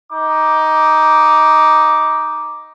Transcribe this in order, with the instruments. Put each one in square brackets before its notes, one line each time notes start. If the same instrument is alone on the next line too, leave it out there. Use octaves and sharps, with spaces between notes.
[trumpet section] D#4 D6